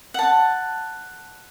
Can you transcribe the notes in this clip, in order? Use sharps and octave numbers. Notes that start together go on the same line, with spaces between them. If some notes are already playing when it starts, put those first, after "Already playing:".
F#5 A5